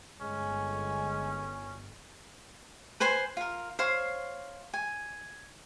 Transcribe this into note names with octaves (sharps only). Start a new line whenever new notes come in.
G1 G2 G#3 C#4
B4 C5 G#5 C6
F4 A#4
C5 C#5 F5 C6
G#5